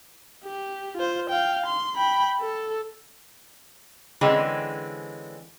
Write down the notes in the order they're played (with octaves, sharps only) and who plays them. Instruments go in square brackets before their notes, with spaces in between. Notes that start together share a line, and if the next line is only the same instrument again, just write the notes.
[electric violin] G4
F4 C5
F5 G5
C6
G5 B5
A4
[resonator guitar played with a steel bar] D3 E3 G#3 C4 C#4